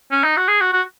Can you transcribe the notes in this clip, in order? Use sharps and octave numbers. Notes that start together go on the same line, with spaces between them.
C#4
D#4
F#4
G#4
F#4
F#4